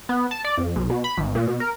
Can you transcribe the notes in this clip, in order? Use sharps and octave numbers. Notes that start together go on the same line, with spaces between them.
B3
A5
D5
F2
B1
B2
B5
G#1
A#2
B2
A#4